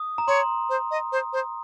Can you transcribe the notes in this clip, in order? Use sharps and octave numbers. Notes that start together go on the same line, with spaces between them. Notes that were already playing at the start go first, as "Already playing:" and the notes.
Already playing: D#6
A#5
C#5 C6
C5
D#5
C5
C5